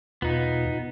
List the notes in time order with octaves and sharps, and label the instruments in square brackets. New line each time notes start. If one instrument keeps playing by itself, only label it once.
[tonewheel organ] E2 B2 F4 [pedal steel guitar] B3 D#4